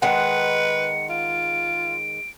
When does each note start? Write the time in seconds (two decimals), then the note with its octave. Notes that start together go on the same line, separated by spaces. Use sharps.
0.02 D#3 G#3 B4 F#5 C#7
1.09 F4 D7